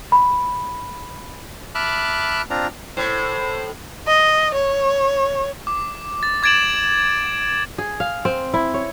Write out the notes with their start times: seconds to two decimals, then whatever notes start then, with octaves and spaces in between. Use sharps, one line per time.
0.12 B5
1.75 E5 A5 B5 D6 F6 F#6
2.50 C4 D4 F4 A#5
2.97 A2 C5
4.07 D#5
4.55 C#5
5.67 D6
6.23 A6
6.43 D6 G#6 A6 D7 E7 F#7
7.78 G#4
8.00 F5
8.25 C4
8.54 E4
8.74 C#5